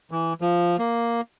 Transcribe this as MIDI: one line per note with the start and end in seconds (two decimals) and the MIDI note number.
0.11 0.33 52
0.41 0.77 53
0.79 1.21 58